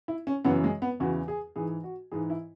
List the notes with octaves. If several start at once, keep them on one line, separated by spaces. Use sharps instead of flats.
E4
C#4
F#2 C#3 E3 B3
G#3
B3
E2 C#3 E3 F#4
G#4
G#2 E3 G#4
F#4
G#2 E3 G#4
E4